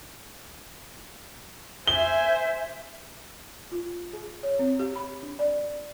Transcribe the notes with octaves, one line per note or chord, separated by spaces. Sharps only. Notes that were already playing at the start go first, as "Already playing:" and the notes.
C5 E5 G#5 G7
F4
G#4
C#5
C4
G4
B5
D4
D5